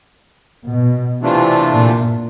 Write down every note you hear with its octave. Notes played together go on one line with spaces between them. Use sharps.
B2
C3 E3 A3 D4 F4
A#2